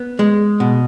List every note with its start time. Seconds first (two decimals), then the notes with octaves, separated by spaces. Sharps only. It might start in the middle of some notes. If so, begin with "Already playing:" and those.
Already playing: B3
0.19 G#3
0.60 B2